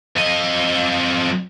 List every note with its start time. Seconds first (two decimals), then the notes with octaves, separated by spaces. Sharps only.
0.16 F2 D#5